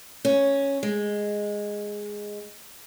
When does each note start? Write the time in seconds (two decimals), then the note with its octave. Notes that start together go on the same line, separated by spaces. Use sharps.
0.25 C#4
0.83 G#3